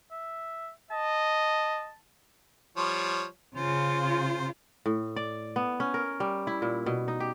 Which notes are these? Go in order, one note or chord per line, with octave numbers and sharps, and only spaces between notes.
E5
D#5 A5
F3 G3 C#5
C#3 F4 C5
A2
D5
B3
C#4
A#4
G3
E4
A#2
B2
D#4
G4